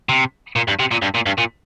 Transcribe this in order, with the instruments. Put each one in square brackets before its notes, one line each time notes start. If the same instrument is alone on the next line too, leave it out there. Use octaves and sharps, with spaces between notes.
[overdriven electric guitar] C3
A#2
G2
C3
A#2
G2
A#2
G2
A#2